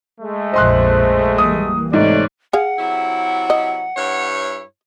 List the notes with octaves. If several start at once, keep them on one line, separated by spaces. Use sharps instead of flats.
G#3 A3
A#1 F2 C5 D#5 C6 F#6
E3 G3 A#3 D#6
G#2 C3 A3 C#5 D5
G#4 F5 F#5
C3 F#3 E4
D#5
G2 E4 C#5